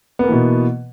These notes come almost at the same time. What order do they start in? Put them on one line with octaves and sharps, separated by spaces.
B3 A#3 E3 B2